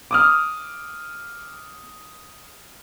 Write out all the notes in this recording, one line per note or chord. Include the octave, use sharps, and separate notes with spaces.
D6 D#6 F6